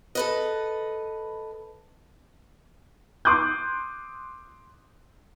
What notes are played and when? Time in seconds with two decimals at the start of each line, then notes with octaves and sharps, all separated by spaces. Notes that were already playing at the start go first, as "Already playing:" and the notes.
0.15 A4 B4 D#5
3.25 C6 D6 D#6 F#6 G6